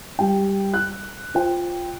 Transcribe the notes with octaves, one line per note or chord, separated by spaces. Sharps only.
G3 G5
F#6
F4 C5 G5